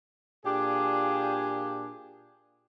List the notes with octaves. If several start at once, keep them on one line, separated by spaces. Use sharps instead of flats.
A#2 D4 G4 G#4